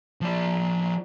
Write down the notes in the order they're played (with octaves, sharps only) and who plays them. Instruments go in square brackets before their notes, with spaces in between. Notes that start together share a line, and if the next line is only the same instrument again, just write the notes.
[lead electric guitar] F3 D5